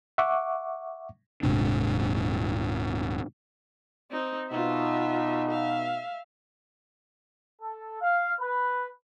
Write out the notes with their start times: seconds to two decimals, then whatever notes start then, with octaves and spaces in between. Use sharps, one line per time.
0.18 E5 F#5 C#6 D6
1.43 D#1 G#2 C3 D4
4.11 C4 D#4
4.51 B2 D#4 F4 E5
5.49 E5 F5
7.61 A4
8.02 F5
8.40 B4